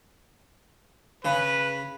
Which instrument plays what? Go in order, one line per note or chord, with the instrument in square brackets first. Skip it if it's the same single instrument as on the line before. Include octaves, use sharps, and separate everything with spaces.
[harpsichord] C#3 [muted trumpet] B4